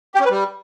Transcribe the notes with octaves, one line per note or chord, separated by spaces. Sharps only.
G4
C#4
B4
G3